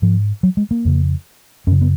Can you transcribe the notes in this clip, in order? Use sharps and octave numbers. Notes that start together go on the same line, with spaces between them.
G#2 F3
F#3
G#3
A#3
F2 C#3
F#2 C#3 C#4
B3